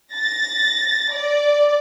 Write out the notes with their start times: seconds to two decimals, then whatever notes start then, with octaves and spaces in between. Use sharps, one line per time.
0.13 A6 A#6
1.14 D5